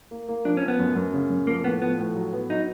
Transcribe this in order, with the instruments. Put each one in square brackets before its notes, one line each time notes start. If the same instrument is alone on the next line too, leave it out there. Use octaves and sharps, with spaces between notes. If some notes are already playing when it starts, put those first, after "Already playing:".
[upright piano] A#3
A#3
[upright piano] F3 [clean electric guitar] D4
[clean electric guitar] C#4
[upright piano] F3
[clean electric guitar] B3
[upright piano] F#2
F#2
C#3
F#2
[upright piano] F3 [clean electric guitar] A#3
[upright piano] A2 [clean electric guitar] B3
[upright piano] F3 [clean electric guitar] B3
[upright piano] A2
F#3
B3
[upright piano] F#3 [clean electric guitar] D#4